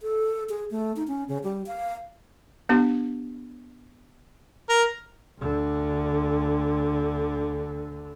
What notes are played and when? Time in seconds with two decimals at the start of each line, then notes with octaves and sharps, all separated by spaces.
0.01 A4
0.49 G#4
0.71 A3
0.96 D#4
1.08 C#4
1.29 C#3
1.44 G3
1.67 F5
2.69 B3 D4 G4
4.69 A#4
5.40 D2 D3